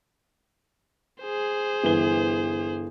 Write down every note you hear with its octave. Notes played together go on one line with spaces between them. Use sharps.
G#4 C5
G1 E3 G7